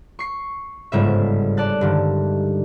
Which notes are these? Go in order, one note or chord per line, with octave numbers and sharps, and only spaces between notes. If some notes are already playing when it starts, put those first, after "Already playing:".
C#6 C7
G1 G#2 C#3 E5
D5 A5 F#6 A6
G2 D3 D#3